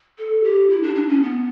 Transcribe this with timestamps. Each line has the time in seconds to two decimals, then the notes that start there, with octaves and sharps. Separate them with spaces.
0.19 A4
0.44 G4
0.70 E4
0.83 D4
0.95 D4
1.09 C#4
1.22 B3